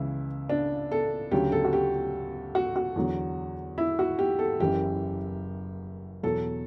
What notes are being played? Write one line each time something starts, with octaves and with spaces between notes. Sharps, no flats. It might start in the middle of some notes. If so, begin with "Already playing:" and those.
Already playing: C#2 C#3 E3 E4
D4
A4
D2 C#3 F#3 G4
A4
F#4
G4
F#4
F#4
E2 D3 F#3
E4
F#4
G4
A4
F#1 F#2 E3 G4
E2 B2 F#3 A4